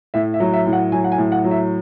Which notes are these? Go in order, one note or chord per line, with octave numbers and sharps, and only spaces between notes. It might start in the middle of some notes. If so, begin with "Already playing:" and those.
A2 E5
E5
F#3
E5
A2
F#5
F#3 G#5
F#5
G#5
A2
F#5
F#3
E5